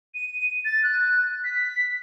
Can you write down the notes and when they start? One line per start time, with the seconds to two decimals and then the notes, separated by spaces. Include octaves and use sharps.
0.14 D#7
0.65 A6
0.84 F#6
1.44 B6